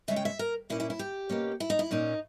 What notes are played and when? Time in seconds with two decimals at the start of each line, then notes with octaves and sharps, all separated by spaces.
0.08 C#3 G#3 C#4 E5
0.16 G5
0.25 E5
0.39 A#4
0.70 A#2 A#3 C#4 E4
0.80 E4
0.90 E4
0.99 G4
1.29 B2 A#3 C#4
1.60 E4
1.70 D#4
1.79 E4
1.91 A#2 A#3 C#4 D#4